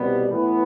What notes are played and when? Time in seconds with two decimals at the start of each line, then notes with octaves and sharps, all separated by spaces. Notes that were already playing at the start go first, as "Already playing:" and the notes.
Already playing: C2 B2 G3 B3
0.30 A2 E3 B3